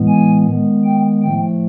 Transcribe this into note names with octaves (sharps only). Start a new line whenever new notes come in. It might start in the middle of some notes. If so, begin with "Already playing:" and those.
Already playing: A2 E3 G#3 B3
G#5
D#3 G#3 B3
G5
A2 F3 A3 G5